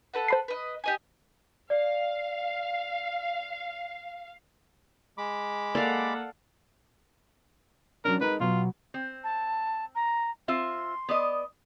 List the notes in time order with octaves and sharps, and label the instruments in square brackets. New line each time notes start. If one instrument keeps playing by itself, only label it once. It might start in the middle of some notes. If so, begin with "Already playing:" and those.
[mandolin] A4 B4 F#5
[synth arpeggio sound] C5 B5 C7
[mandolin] B4 D#5
G4 D#5 G#5
[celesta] D5 [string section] F5
[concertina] G#3 B5 D6
[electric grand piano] A#3 [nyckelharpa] A4 F#5 [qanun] D5 F5
[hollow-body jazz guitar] F#3 C#4 D4 [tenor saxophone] A#4
[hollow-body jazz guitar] G#3 D#4 A#4 [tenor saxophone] B4
[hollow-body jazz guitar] B2 F#3 B3 [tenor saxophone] F4
[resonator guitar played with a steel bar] C4
[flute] A5
A#5
[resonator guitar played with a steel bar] C4 F4 E5 [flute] C6
[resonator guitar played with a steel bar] B3 D5 D#5